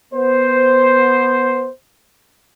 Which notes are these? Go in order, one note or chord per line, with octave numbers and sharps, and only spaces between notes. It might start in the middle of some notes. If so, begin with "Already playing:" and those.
B3 C5